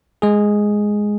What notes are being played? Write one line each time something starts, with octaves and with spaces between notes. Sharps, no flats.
G#3 G#4